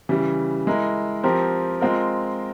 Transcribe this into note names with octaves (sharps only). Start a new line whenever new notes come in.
C#3 E3 G3
G#3 E4 A#4
F3 C4 G4 A#4
G#3 C4 F4 A#4